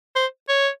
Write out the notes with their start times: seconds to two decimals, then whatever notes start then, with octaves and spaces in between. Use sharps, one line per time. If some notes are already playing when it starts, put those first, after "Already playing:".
0.16 C5
0.49 C#5